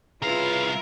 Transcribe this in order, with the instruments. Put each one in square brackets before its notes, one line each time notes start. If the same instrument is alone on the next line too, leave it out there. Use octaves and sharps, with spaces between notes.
[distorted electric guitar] C2 F5 [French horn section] C#3 G#4 B4 [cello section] E4 F4 [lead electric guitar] A#4